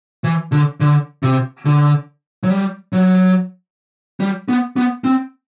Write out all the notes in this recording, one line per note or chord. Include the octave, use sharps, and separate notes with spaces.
E3
D3
D3
C3
D3
F#3
G3
F#3
G3
B3
B3
C4